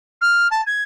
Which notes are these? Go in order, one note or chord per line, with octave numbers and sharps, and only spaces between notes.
F6
A5
G#6